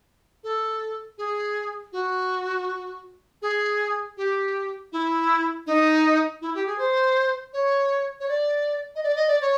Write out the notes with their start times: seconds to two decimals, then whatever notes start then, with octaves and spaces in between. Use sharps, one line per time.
0.44 A4
1.18 G#4
1.93 F#4
3.42 G#4
4.17 G4
4.92 E4
5.67 D#4
6.41 E4
6.55 G4
6.66 G#4
6.78 C5
7.53 C#5
8.20 C#5
8.28 D5
8.95 D#5
9.03 D5
9.16 D#5
9.28 D5
9.41 C#5